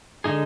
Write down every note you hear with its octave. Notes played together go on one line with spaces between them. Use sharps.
D3 G#3 D#4 G#4